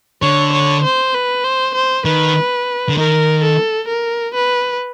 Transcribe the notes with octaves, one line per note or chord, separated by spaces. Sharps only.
D3 C#5
C#5
C5
B4
C5
C5
D#3 B4
D3
D#3 A#4
A4
A#4
B4